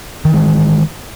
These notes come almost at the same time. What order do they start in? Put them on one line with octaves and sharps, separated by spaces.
D#3 E3 G#3